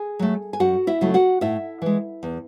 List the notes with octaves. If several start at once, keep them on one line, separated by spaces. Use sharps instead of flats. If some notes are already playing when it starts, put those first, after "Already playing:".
Already playing: G#4 G#5
F#3 A3
G#5
F#2 F#4 F#5
E4 E5
C#3 F#3 A3
F#4 F#5
A2 E4 E5
E3 G#3
E2